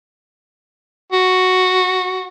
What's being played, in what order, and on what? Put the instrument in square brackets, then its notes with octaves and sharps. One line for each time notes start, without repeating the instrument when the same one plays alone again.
[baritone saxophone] F#4